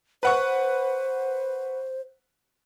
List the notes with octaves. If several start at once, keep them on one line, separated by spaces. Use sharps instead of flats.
B4 C5 F#5 C#6